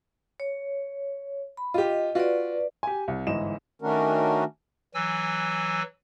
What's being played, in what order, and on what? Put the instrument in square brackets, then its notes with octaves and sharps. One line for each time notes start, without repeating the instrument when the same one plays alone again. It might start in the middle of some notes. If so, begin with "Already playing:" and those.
[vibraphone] C#5
B5
[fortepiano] F4 G4 [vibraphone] D#5
[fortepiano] F4 F#4 [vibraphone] B4 D5
[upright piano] G4 G#5
C2
G1 G#2 E3 D#5 E7
[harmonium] D#3 A3 C#4 D4 F#4 A#4
[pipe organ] E3 F#3 G#5 E6